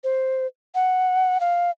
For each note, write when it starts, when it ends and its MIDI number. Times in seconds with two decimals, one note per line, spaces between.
0.04 0.46 72
0.75 1.40 78
1.40 1.70 77